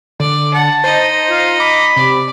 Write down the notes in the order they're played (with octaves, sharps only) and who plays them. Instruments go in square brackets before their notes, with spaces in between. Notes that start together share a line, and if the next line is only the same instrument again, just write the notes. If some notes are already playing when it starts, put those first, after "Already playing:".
[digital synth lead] D3 [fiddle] D5
[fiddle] F#5 [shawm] A5
[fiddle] D#4 D#5 [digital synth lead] C5
[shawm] F4
[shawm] B5 [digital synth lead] D6
[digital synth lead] C3 [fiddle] D5